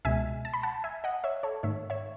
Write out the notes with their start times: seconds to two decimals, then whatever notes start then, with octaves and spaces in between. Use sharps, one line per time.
0.05 C#2 B2 G#3 E5 G#5
0.45 A5
0.53 B5
0.63 F#5 A5
0.84 E5 G#5
1.04 D#5 F#5
1.24 C#5 E5
1.43 A4 C#5
1.63 G#2 D#3 A3 C#5 E5
1.90 C#5 E5